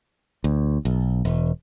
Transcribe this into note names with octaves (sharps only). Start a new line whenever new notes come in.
D2
B1
E1